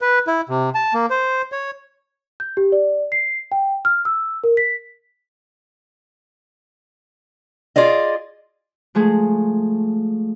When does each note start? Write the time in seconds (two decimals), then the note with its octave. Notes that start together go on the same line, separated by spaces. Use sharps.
0.01 B4
0.27 E4
0.49 C3
0.75 A5
0.94 A#3
1.10 C5
1.52 C#5
2.40 G6
2.57 G4
2.72 D5
3.12 C7
3.52 G5
3.85 F6
4.05 E6
4.44 A#4
4.57 B6
7.76 F4 G#4 D5 D#5
8.95 F3 G#3 A3 G#4